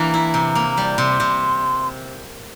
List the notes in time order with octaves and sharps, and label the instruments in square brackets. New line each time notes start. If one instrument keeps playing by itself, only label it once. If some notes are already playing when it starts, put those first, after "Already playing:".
Already playing: [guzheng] E3 A#3 D4 [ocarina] A#5
[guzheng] E4
C3
A#3
G3
[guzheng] C3 [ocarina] C6
[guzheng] C3